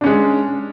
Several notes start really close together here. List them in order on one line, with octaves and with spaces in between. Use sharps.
D4 C#4 G#3